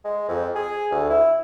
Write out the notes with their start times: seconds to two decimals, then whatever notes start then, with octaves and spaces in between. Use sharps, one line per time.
0.04 G#3
0.28 F2
0.55 G#4
0.91 D2
1.10 E4